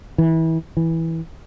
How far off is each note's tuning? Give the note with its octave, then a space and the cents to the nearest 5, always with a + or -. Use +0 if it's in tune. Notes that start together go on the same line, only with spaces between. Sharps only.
E3 -25
E3 -10